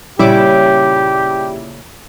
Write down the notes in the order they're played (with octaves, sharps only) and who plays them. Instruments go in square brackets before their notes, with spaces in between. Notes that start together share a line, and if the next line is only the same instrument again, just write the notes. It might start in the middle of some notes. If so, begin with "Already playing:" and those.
[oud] A#2 C#3 C#4 [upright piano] G3 [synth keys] E4 D6 [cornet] G4